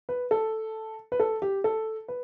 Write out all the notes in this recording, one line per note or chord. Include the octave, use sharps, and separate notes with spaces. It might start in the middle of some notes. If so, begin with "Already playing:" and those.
B4
A4
B4
A4
G4
A4
B4